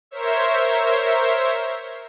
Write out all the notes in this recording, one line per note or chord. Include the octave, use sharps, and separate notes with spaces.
A#4 C5 C#5 E5